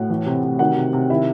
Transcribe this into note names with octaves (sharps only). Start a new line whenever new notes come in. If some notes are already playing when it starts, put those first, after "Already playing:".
Already playing: A2 F#4 F#5
E3
C3
C3
D#3 F#4 F#5
C3
C3
D#3 E4 E5